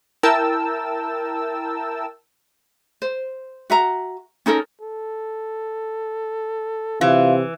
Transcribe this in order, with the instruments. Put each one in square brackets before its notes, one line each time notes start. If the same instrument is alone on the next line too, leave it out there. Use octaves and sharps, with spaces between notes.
[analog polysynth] E4 A#4 G5 A5 E6
[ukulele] C5
F#4 E5 A#5
C#4 D#4 A4 A#4
[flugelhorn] A4
[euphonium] C3 [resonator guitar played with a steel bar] E3 [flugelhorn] E4 [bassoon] F4